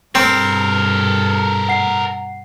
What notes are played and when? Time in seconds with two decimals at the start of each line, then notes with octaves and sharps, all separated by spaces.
0.15 G2 B2 C4 A4 A#4
1.69 F#5 C7